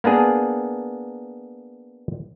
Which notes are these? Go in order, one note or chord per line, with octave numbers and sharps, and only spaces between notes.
A#3 B3 D4 G#4